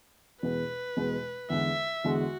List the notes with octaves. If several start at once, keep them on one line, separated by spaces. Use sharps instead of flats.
E2 B2 G#3 B3 B4
E2 B2 G#3 B3
E2 D3 G#3 E5
E2 D3 G#3 F#4